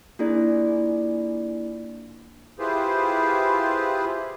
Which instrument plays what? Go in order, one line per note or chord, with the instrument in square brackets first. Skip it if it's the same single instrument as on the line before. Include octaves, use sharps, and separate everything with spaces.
[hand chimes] A#3 D4 E4 F4 G#4 D5
[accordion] E4 F4 G4 G#4 B4 C5